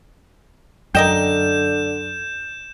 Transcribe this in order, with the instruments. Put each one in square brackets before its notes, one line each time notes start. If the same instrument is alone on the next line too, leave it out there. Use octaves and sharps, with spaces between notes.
[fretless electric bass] F#2 [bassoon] D3 [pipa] A#4 D#5 G5 [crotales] G6 E7